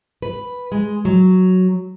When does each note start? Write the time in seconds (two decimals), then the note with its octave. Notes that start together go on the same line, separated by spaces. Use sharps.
0.22 B4
0.72 G#3
1.05 F#3